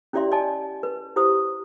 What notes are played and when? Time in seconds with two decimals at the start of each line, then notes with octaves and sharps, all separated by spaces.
0.13 C#4 E4 G4 D5 E5 C6
0.31 D5 D#5 G#5 A5
0.83 B4
1.16 E4 G4 C5 D#6